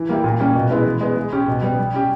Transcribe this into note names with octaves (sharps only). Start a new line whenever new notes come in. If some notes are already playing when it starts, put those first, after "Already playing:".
Already playing: E3
G3 A#3 E4 G4
A#2
G3 A#3 C#4
B2
G#3 B3 E4
E3
G#3 B3
G#3
C#4 G4
B2
G3 B3
G3
C#4 G4